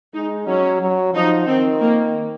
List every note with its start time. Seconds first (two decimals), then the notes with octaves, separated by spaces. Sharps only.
0.14 G#3 D#4
0.47 F#3 C#4
0.82 F#3
1.14 F3 D#4
1.48 D#3 C4
1.81 A#3